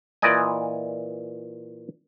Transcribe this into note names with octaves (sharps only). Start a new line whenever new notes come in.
A#2 E3 D5 D#5 G#5